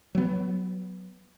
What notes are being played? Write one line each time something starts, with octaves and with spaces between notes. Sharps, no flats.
F#3 B3